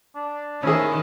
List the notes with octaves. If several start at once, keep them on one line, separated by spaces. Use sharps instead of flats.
D4
D#3 C#4 E4 G#4